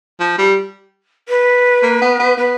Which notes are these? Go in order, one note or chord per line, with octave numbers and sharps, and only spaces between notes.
F3
G3
B4
A#3
B3
B3
B3 B4